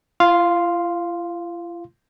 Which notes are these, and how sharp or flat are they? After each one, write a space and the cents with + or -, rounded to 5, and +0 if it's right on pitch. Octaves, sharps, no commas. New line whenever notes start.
F4 -45 F5 +0 C6 +0